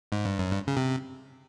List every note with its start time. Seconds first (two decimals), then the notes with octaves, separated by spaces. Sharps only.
0.12 G#2
0.25 G2
0.39 F#2
0.52 G2
0.67 C#3
0.77 C3